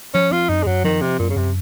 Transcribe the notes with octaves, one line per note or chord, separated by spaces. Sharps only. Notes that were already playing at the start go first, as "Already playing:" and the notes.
F3 C#4
C4 F4
F#2 D#4
G#3
F#2 F#3
D#3 F3
C3 C4
F#2 A#2
C#3
F#2 C3